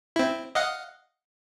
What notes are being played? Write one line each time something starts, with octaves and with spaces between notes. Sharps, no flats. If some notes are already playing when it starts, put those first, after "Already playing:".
C4 E4
D#5 F5 F#5